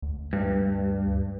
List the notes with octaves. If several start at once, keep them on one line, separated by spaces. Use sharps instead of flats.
D2
G2